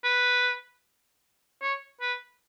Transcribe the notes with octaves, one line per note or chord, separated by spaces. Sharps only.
B4
C#5
B4